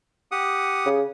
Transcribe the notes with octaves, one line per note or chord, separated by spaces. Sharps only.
G4 F#5 D#6
C#3